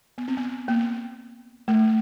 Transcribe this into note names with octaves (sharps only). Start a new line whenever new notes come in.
B3
C4
B3
A#3
A3